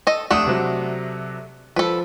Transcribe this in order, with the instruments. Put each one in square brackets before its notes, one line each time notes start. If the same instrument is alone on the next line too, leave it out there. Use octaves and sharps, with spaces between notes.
[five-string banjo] A4 D#5
[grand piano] F1 D#6 [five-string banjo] A3 D4 F#5
[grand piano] C3 F#3
[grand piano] F3 [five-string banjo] A4 B4